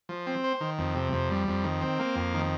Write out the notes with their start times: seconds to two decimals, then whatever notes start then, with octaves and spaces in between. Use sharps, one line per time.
0.09 F3
0.27 C4
0.44 C5
0.61 D#3
0.79 F2
0.95 C3
1.12 F2
1.30 G3
1.48 F2
1.64 D#3
1.81 C4
1.99 A#3
2.16 F2
2.34 D#3